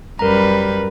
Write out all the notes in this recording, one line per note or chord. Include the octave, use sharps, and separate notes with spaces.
F#2 G3 A#4 B4 A#5